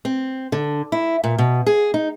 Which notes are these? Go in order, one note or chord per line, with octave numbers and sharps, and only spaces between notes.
C4
D3
E4
A#2
B2
G#4
D#4